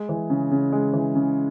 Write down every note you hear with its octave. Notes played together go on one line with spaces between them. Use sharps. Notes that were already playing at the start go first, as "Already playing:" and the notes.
Already playing: G#3
E3
C#3
C#3
G#3
E3
C#3